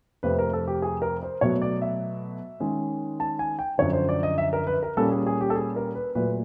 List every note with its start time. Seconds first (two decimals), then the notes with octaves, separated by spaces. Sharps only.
0.23 F2 C3 F3 A3 B4
0.39 A#4
0.53 A4
0.67 G4
0.82 G#4
1.02 A#4
1.23 C5
1.41 B2 F#3 A3 C#5
1.62 D5
1.82 E5
2.60 D#3 G#3 C#4
3.20 A5
3.39 G#5
3.59 G5
3.78 F#2 D3 F3 C#5
3.93 C5
4.09 D5
4.23 D#5
4.38 E5
4.53 A#4
4.67 B4
4.83 A#4
4.97 A#2 G3 A#3 C#4 A4
5.11 G#4
5.26 G#4
5.41 G4
5.50 A4
5.55 G#4
5.76 A#4
5.95 B4
6.15 A#2 F#3 A3 B4